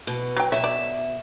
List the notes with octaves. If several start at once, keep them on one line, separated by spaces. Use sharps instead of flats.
B2
F#3 G5
B2 C#5 E5
D5